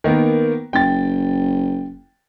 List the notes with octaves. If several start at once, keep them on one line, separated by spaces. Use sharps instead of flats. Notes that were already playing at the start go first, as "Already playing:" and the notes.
D#3 A#3 B3
F#1 G5 A6